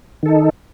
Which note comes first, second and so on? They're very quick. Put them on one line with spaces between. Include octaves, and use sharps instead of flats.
D#3 A4 D#4